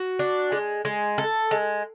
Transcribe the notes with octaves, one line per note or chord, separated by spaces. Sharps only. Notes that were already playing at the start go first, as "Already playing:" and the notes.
Already playing: F#4
D4
G#3
G#3
A4
G#3